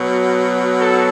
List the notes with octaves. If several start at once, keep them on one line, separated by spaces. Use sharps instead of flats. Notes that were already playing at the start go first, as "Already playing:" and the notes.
Already playing: B2 F#3
A4